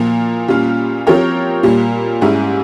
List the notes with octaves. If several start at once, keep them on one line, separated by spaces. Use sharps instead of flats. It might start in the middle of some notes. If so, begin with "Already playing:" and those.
Already playing: A#2 F3 A#3
A#2 G3 C#4 F4
F3 C4 G4 A#4 C#5
A#2 G3 A#3
G#2 G3 C#4 E4 G#4